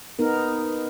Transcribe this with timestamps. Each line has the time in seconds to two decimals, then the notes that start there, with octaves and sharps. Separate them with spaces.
0.19 B3 D#4 A#4